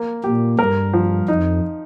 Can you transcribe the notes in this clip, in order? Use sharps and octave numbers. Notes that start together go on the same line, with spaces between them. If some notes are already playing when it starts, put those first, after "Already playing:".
Already playing: A#3
A#2 G4
G2 A#4
F3
F2 D#4